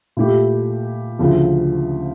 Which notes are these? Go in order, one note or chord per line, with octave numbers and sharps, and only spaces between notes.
A#2 A3 E4 G4
D2 C#3 F3